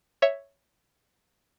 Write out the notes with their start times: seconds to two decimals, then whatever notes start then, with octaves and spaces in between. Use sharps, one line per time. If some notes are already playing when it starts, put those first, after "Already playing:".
0.22 C#5 E5